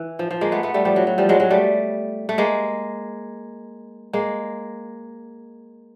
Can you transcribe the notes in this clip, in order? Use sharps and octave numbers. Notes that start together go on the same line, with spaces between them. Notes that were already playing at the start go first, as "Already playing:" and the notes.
Already playing: E3
F3
F3
G#3 A#3
A3 B3
A3 B3
G3 A3
F3 G3
F#3
F#3
F3 G3
F#3 G#3
F#3 G#3
G3 A3
A3
G#3 A#3
G#3 A#3